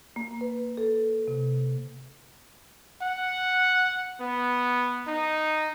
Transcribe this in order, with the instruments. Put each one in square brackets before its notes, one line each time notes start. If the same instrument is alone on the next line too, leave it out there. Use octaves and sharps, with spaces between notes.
[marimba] A#3
B4
A4
C3
[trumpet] F#5
B3
D#4